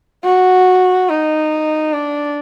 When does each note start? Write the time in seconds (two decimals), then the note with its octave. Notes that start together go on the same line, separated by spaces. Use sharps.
0.24 F#4
1.09 D#4
1.93 D4